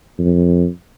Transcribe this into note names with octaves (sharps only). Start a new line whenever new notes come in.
F2